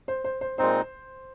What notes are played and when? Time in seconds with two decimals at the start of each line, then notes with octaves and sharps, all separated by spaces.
0.08 C5
0.24 C5
0.41 C5
0.58 A#2 G#3 C4 D#4 C5